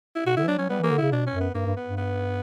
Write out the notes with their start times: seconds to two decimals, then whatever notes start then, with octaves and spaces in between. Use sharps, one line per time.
0.16 E4
0.26 B2 F#4
0.37 D3 E4
0.43 E3
0.48 F#3 D4
0.58 F#3 C#4
0.69 G3 B3
0.80 E3
0.84 A#3
0.91 D3
0.98 C#3 E4
1.12 B2 D4
1.27 C#4
1.33 F#2
1.41 B3
1.55 G2 A#3
1.66 G2
1.77 B3
1.87 G2
1.97 B3